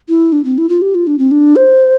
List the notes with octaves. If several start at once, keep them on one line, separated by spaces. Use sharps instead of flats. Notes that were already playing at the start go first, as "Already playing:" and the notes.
E4
D4
C4
E4
F4
G4
F4
D4
C4
D4
C5